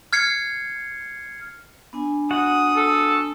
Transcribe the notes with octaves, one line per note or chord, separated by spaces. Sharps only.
F6 G#6 C7 C#7
B3 D4 G#5
F#4 F#5 D#6
A4